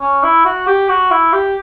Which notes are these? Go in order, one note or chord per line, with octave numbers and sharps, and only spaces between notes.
C#4
E4
F#4
G4
F#4
E4
G4